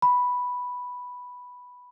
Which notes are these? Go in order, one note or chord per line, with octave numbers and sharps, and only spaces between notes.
B5